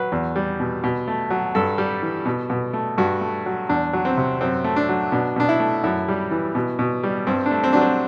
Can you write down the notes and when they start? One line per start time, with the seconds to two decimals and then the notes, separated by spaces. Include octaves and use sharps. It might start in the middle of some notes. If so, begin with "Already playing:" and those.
Already playing: F#3 B4
0.12 E2
0.36 G3
0.60 B2
0.84 B2
1.08 A3
1.30 F#3
1.55 G2 A4
1.78 G3
2.02 E3
2.26 B2
2.50 B2
2.73 A3
2.98 G2 F#4
3.21 A3
3.46 F#3
3.69 E2 D4
3.93 F#3
4.05 C4
4.17 C3
4.41 F#2 C4
4.64 A3
4.76 D4
4.89 F#3
5.12 B2 D4
5.36 B2 D4
5.49 E4
5.60 A3
5.84 F#2 E4
6.08 G3
6.31 E3
6.55 B2
6.79 B2
7.03 G3
7.27 G2 C4
7.46 D4
7.51 A3
7.64 C4
7.73 F#3 D4
7.81 C4